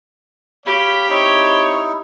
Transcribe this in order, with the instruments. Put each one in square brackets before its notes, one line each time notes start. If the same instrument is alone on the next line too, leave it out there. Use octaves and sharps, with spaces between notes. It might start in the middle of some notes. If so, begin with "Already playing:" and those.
[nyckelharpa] G4 G5 [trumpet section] C#5 F5 B5
[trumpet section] C4 C#5 [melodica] D#4 E4